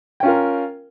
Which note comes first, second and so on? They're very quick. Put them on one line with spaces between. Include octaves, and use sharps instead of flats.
G5 C#4 F4 A#4